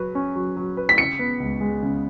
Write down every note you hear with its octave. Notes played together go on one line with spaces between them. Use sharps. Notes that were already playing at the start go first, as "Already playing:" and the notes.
Already playing: F#3 B4
C#4
F#3
F#3
B4
B6
C#3 C#7
B3
C#2
G#3
C#3